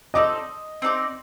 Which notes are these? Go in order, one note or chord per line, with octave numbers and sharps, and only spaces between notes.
C4 D#4 A4 D5 D#5
C4 D#4 A4 D5